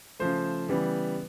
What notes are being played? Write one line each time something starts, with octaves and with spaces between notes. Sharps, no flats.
C#3 F3 A3 C5
C#3 E3 G3 B3